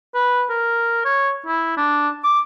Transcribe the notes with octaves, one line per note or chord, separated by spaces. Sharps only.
B4
A#4
C#5
E4
D4
D6